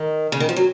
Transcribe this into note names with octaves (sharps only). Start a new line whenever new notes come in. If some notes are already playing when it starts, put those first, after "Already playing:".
Already playing: D#3
C#3
D#3
F3
F#3